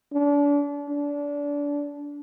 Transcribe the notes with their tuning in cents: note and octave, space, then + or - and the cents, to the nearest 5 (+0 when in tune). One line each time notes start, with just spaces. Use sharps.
D4 -35
D4 -25